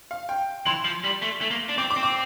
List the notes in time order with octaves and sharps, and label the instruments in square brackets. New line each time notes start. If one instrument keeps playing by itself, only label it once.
[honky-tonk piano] F5
G5
[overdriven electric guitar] E3 [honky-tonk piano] C6
[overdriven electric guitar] F3
G3
A3
A3
A#3
D4
[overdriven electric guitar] C4 [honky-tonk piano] D6
[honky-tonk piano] D6
[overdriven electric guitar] C4
[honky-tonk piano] D6